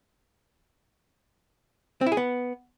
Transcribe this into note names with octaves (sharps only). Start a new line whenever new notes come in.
C4
E4
G#4
B3